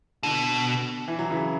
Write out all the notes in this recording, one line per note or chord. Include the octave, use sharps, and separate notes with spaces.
B2 D3
E3
F#3
C#3 E3